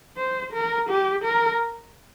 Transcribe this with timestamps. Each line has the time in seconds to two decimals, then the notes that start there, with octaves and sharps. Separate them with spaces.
0.17 C5
0.53 A#4
0.90 G4
1.25 A#4